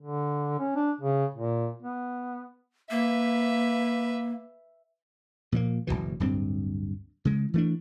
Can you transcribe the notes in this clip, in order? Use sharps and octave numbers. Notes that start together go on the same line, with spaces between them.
D3
C#4
D4
C#3
A#2
B3
A#3 B4 E5
A#2 F3 G3 A#3
F#1 C#2 B2 E3
D1 G2 C4
C#3 G#3
E3 A3 D4